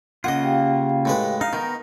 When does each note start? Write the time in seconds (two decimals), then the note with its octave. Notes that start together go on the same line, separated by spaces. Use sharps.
0.24 C#3 A#3 F4 D#5 F#5
0.43 G4 F5 G5
1.05 A2 G#3 B4
1.41 D#4 F5
1.53 D#3 B3 D#4 A#4